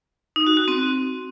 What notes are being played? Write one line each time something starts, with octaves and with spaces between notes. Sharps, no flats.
D#4
F#4
F#4
C4